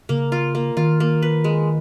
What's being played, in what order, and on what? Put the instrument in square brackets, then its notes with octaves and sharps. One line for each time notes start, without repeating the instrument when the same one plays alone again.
[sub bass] C#3 [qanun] A#3
[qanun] F4
A#3
[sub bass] D#3 [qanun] F4
[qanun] A#3
B4
G#3